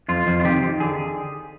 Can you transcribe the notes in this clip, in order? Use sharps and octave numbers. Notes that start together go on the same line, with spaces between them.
F2 F4
F2
F4
D#3 G4
D#3
D3 G#4